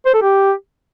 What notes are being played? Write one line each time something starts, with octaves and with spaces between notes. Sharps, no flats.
C5
A4
G4